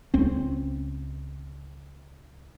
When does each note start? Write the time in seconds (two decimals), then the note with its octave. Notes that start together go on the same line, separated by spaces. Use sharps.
0.14 C#2 C4 C#4